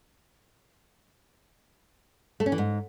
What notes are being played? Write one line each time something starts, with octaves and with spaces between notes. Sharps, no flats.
A3
C#4
E3
G#2